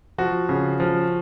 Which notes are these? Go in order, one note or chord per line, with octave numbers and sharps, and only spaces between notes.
F3 F#4
C#3
F3